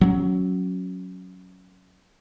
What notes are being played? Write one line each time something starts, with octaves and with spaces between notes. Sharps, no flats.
F#3 C4 C#4